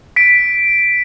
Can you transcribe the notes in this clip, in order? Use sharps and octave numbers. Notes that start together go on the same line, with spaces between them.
B6 D7